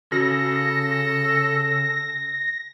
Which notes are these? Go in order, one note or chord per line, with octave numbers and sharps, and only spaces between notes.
C#3 F#4 A4 A#6